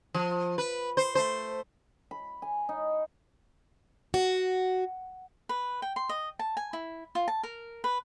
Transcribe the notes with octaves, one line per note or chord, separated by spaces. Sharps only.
F3
B4
C5
A3 C5
B5
G#5
D#4
F#4
B4
G5
C6
D#5
A5
G#5
E4
F4
A5
A#4
B4